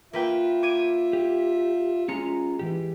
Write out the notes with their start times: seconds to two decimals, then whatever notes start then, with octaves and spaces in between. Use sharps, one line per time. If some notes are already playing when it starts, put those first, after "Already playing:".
0.13 A#3 F4 B4 E5 G5
0.63 D6 G#6 D#7
1.13 G4
2.08 G#3 C#4 F4 A#5 C#7
2.59 E3 F3 G4